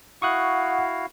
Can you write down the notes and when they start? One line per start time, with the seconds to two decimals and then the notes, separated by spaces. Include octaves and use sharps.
0.22 E4 F#4 F5 F#5 C#6 D#6 F#6